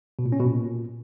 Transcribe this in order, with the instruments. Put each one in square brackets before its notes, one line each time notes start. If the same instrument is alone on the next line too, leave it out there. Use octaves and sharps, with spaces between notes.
[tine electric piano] B2
A#2
C#4
B2
A#2